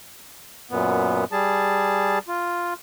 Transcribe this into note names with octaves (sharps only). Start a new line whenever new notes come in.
F#2 A#2 B3
G3 G#4 A5
F4